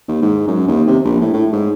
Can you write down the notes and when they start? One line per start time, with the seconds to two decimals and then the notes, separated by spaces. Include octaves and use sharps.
0.08 D#2
0.22 G#2
0.48 F#2
0.68 D#2
0.87 C3
1.05 A#1
1.21 A2
1.34 A2
1.52 G#2